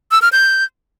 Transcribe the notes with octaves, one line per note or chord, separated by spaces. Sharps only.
E6
F6
G6